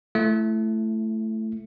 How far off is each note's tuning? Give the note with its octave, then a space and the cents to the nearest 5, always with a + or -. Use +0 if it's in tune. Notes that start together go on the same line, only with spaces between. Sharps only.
A3 +0 E4 +25